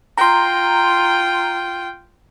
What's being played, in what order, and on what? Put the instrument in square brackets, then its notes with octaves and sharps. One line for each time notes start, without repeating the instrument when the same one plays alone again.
[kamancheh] F4 G5 [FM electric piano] A#5 C6